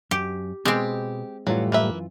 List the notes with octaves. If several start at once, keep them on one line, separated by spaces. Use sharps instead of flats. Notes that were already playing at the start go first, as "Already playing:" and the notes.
F#2 G4
B2 G#3 C4 G4
F#2 A2 E3 F#3 G3 F4
A#3 B4 E5